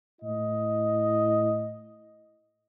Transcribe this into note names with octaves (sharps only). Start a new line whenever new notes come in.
A2 E4 D#5